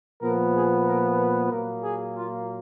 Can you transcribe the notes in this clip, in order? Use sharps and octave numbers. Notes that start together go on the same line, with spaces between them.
A#2 F3 B3 A#4
G#4
A#4
B4
A#2 F#3 A#3 A#4
G#4
F4